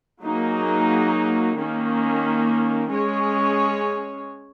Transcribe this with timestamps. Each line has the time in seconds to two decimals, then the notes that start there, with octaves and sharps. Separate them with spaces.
0.22 F#3 A#3 D#4 G#4
1.56 D#3 A#3 C#4
2.89 G#3 C#4 G#4 C#5